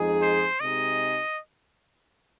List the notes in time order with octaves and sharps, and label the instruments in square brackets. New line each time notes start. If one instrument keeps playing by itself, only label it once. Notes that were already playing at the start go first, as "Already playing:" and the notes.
Already playing: [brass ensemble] F2 F3 G#3 D#4 G#4
[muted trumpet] C5
[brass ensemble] C3 G#3 D#4 G#4 [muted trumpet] D#5